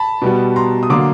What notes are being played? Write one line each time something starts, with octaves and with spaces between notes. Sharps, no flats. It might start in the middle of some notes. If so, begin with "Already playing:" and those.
Already playing: A5 B5
B2 G3 B3
A#5 C6
D#6
D3 F#3 A#3 C6 D6